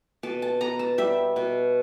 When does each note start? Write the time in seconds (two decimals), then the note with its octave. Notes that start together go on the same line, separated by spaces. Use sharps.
0.23 B2 A5
0.42 A5
0.61 B3 A#5
0.79 A5
0.98 G3 E5
1.36 B2